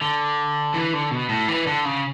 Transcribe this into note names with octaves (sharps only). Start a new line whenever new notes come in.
D3
E3
D3
B2
A2
E3
D3
C#3